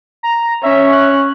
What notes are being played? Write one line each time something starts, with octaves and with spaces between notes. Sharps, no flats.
A#5
C#4 E5
F#6